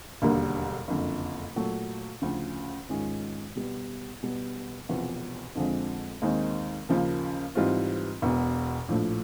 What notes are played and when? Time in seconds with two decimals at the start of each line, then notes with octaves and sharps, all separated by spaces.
0.22 E1 D#2 D3 G3 A#3
0.88 F#1 F2 D3
1.56 A#2 F#3 A3
2.22 D2 C#3 F3
2.89 G#2 D#3 G#3 C#4 F4
3.55 B2 G3 B3
4.23 B2 G3 B3
4.89 E1 E2 C3 F3
5.55 F2 D3 F3 G#3 C4
6.22 D#2 D#3 G#3 C4 D#4
6.89 D#2 C#3 F3 A#3
7.55 G#2 E3 G3 C4 F4
8.22 E1 E2 B2
8.88 A#1 A2 F3 A3